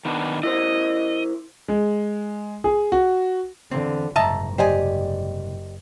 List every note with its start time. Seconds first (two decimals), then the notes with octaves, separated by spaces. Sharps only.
0.05 D#3 B3 D4
0.43 E4 A#4 C5 D#5
1.68 G#3
2.64 G#4
2.92 F#4
3.71 E2 D3 C4
4.16 F#1 C2 G#2 D#5 E5 A5 A#5
4.58 G4 C5 D5 D#5 G#5